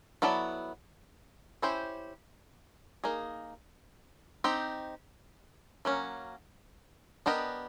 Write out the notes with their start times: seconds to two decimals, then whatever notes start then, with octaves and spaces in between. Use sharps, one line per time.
0.22 F#3 B3 E4 A4 D5
1.62 C#4 E4 G4 C5
3.04 A#3 D#4 G#4
4.44 C4 D#4 G4
5.85 F#3 A#3 C#4
7.26 B3 D4 G4 A#4 D#5